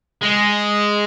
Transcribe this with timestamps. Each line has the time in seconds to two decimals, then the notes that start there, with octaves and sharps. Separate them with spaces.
0.23 G#3